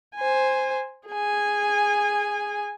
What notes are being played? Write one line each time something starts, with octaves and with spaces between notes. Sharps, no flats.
C5 G#5
G#4 G#5